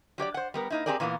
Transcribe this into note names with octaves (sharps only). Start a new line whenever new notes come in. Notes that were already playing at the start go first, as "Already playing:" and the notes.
F#3 G4 C#5 D5
C5 F#5
G3 B3 A#4
A#3 D#4 E4
C4 D#4 G4 G#4 A#4 D5
A#2 E3 A#3 B3 F4